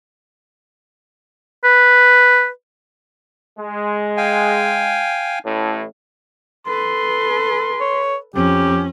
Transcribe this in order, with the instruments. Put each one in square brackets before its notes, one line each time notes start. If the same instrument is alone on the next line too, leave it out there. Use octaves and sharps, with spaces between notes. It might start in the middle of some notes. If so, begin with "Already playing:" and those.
[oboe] B4
[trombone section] G#3
[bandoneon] F5 G5 G#5
[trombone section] A1 A2
[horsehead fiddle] A4 B4 [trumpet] C6
[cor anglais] C#5
[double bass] F2 [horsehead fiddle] C#4 [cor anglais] G4